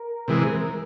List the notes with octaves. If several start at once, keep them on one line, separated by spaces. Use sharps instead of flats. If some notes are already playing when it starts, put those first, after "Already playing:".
Already playing: A#4
C3 E3 G#3